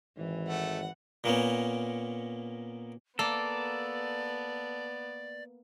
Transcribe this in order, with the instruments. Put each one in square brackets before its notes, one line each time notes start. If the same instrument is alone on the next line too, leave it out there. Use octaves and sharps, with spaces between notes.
[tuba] G#1 [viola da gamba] E3
[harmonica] A3 [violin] F#5
[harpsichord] A#2 A#3 B3 C#4
[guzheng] A#3 [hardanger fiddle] B3 [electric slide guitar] A4 [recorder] D5